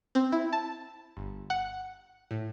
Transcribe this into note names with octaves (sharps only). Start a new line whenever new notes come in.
C4
E4
A5
G1
F#5
A2